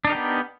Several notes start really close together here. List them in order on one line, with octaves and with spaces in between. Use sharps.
D4 D#4 A#4 G4 B3